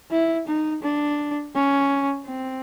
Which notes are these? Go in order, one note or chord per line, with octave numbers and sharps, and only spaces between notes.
E4
D#4
D4
C#4
C4